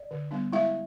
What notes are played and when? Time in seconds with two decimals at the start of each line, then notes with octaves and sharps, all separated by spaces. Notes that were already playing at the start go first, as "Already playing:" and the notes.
Already playing: D5
0.11 D3
0.31 G3 B3 D4
0.53 G#3 E4 E5